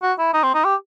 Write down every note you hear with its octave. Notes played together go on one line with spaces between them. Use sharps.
F#4
E4
D#4
C4
D#4
G4